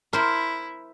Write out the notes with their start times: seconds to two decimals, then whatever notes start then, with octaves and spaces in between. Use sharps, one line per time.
0.13 E4 A#4 C5